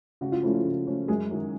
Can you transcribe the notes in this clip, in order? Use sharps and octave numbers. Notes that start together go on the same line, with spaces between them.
C#3 F#4
F4
F3 A3 C#4 E4
F4
C#3
F3 A3 C#4
F#2 G#3 G#4
D#3 F#3